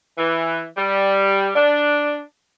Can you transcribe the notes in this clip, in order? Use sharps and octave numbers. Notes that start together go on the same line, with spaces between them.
E3
G3
D4